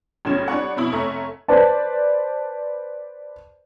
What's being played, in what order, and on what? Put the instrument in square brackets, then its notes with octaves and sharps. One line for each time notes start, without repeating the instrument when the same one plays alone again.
[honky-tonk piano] G#1 A2 C#3 F#3 G#6 E7
G3 D4 C#5 F#5
F2 B2 E4 F#7
F1 A3 C#5 E5 A#5
[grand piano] B4 C5 D5 A5